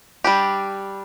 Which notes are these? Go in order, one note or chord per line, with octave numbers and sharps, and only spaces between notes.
G3 D4 G4